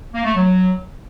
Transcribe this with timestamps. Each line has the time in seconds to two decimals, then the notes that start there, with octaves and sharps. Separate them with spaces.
0.14 A#3
0.24 A3
0.34 F#3